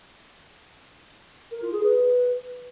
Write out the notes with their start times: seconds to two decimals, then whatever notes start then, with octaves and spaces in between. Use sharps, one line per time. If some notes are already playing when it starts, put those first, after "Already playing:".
1.51 A#4
1.62 F4
1.73 G#4
1.83 B4